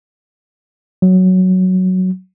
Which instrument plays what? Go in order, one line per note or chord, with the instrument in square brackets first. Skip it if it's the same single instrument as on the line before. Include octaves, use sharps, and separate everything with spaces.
[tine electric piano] F#3